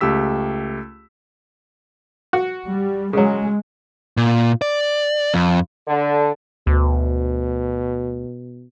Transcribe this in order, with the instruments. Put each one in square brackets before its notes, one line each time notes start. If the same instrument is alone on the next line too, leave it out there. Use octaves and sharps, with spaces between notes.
[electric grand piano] C#2 A3 G4 E6 B6
[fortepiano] F#4
[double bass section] G3
[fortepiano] C#3 F#3 [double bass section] G#3
[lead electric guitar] A#2
D5
F2
[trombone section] D3
[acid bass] D2 [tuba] B2